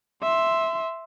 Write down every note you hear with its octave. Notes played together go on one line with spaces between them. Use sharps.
E5 C6